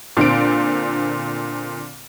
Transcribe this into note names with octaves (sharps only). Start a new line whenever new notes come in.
A#2 D3 C4 D7